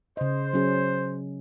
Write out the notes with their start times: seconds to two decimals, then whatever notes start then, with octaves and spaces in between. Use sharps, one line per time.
0.17 C#3 C5 D#5
0.53 F#3 C#4 G#4